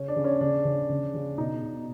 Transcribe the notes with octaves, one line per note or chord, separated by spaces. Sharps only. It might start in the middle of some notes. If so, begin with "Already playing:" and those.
Already playing: C#3 C#4
D4
C#3
C#4
C#3 D4
C#3
C#3
C#3
B2 D#4
B2